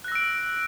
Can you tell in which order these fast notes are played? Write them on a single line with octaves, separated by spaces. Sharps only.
F#6 A#6 E6 D7